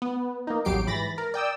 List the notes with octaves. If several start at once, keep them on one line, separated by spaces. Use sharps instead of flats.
B3
A#3 D#4
A1 E2 F#3 G4 C7 D7
G#2 E3 B5 A6 A#6
A#4
D5 G5 D#6 E6